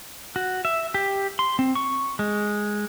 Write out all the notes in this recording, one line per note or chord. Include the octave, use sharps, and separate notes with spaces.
F#4
E5
G4
C6
C4
C#6
G#3